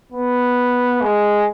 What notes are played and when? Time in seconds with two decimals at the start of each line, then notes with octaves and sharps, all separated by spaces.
0.12 B3
1.01 G#3